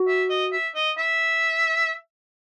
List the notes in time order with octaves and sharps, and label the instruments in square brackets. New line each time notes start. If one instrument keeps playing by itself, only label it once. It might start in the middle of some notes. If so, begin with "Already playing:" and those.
Already playing: [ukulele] F#4
[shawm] E5
D#5
E5
D#5
E5